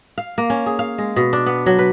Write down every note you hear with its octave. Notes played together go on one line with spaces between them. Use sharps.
F5
A#3
C#4
G#4
F5
G#3
B2
D4
B3
F#3
B4